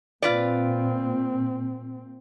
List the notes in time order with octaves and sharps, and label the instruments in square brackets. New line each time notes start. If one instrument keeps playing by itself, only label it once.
[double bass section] A#2 C4 [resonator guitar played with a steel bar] F4 B4 D5